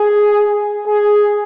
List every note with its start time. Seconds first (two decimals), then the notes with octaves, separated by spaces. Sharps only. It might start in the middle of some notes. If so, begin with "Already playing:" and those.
Already playing: G#4
0.88 G#4